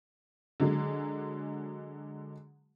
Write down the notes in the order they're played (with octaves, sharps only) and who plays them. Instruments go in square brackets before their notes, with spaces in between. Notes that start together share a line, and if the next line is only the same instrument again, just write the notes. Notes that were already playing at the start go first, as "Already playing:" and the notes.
[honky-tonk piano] D3 F#3 G#3 G#4